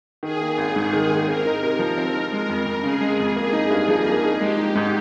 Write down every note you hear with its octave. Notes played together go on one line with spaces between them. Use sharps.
D#3 G#4
A#3
G#1
G#2
D#3
A#3
C4 A#4
D#4
C3
F3
C4
D#4
G#3 A#4
F2
F2
C#3 G#4
G#3
F2
A#3 G#4
D#4
G2
F3
A#3
D#4
G#3 G4
D#4
G#2